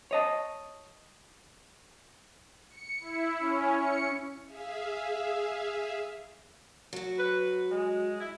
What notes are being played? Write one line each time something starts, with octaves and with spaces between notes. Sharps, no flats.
C#5 D#5 A5
C#7
E4
C#4
C#7
G#4 E5 F5
F#3 F#4
B4
G#3
E4